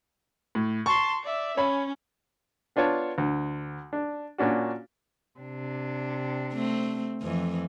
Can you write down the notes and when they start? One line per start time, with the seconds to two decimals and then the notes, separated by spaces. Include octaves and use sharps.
0.55 A2
0.86 A5 C6 C#6
1.23 D5 E5
1.57 C#4 C#5 B5
2.76 B3 D4 F4 C#5 A5
3.18 D2
3.93 D4
4.38 A#2 C#4 D4 F#4
5.40 C3 D4
6.53 A3 C4
7.22 F2 E3